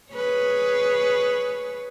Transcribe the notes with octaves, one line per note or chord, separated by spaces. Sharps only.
G#4 B4 C#5